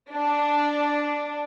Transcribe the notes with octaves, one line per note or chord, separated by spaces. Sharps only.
D4